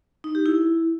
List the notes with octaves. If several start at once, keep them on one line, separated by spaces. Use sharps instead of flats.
D#4
G4
E4